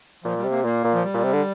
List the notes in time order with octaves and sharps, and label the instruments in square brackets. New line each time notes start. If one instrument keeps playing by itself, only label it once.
[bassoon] A#2 [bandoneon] F3
[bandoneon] G3
[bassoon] C3
[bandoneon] A#3
[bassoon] A#2 [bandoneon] A#3
[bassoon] A#2
[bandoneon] F3
G3
[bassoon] A#2
C3
D3